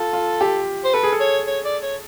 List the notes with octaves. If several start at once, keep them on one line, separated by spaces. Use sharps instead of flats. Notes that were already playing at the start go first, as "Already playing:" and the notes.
Already playing: F4 A4
F4
G4
C5
A4 B4
G#4
A4
C#5
C#5
D5
C#5